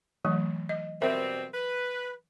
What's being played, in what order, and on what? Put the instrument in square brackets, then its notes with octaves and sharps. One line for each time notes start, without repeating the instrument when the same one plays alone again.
[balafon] E3 F#3 A3
D#5
[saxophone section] B2 G3 C4 [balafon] A#4 C5 E5
[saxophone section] B4